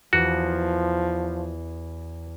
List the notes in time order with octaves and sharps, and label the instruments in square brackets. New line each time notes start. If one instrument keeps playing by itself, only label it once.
[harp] E2 [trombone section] F3 [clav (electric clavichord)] F#4